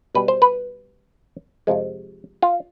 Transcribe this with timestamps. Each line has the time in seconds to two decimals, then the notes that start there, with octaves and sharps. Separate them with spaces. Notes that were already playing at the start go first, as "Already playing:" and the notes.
0.15 B2 G3 B4
0.28 C5
0.42 B4
1.67 F2 C3 F3 G#3
2.42 F4